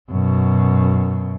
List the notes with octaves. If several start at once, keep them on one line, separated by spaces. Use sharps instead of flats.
F#2 B2